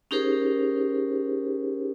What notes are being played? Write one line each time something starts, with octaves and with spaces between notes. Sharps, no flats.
C#4 D#4 G4 G#4 A#4 C5